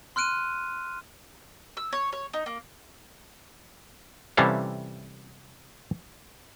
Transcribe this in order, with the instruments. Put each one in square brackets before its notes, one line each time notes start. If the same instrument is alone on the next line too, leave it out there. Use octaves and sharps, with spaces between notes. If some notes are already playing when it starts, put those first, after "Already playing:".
[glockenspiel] C6 F6 F#6 D7 D#7
[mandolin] E6
C#5
C#5
D#4
A#3
[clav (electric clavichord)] C3 E3 G3 C#4 A4 F5